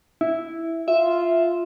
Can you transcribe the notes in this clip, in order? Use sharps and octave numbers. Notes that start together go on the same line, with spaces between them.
E4
F4 E5